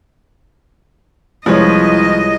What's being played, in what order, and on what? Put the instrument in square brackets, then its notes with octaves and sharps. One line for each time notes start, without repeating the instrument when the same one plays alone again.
[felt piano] C2 G#3 [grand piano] F3 B4 C#5 [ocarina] E4 [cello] D#5